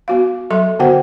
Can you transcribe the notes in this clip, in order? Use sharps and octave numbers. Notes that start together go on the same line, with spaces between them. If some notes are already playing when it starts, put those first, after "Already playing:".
B3 F#4 F5
F#3 A4 E5 C6
D3 B3 F#4 C5 F#5 G5